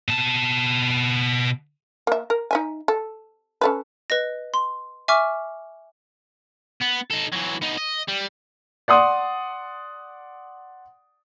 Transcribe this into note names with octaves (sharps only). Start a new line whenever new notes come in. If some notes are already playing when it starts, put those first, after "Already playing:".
B2 A5
A#3 E5
A#4
D#4 E5 G#5
A4
C#4 A4 B4
B4 D#5 A#6
C6
E5 G#5 C#6 D6 F6
B3
D#4 A4
E3 F#3
B3 D#4
D#5
G3
D5 F#5 C6 D#6